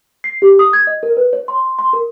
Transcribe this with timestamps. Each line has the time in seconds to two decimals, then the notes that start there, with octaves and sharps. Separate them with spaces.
0.24 C7
0.42 G4
0.59 D#6
0.73 G#6
0.87 D#5
1.03 A#4
1.17 B4
1.33 C#5
1.48 C6
1.79 C6
1.93 A#4